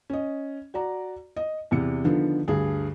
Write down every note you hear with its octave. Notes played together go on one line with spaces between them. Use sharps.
C#4 D#5
F#4 D5 A#5
D#5
E2 C3 C#7
D3 D#3 F3 B3
D2 G2 G#4